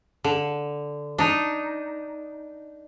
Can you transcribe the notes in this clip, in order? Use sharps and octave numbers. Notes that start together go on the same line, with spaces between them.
D3
D4 D#4